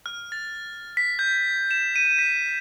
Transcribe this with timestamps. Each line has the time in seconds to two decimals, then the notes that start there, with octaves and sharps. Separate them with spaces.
0.06 F6
0.32 A6
0.97 B6
1.19 G6
1.71 E7
1.96 D#7
2.19 B6